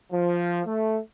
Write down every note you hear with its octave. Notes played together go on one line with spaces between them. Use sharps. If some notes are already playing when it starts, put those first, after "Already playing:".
F3
A3